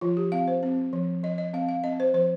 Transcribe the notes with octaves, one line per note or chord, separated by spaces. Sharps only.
F3 F4
G4
C4 F5
C5
C4
F3
F3 D#5
D#5
C4 F5
F5
C4 D#5
C5
F3 C5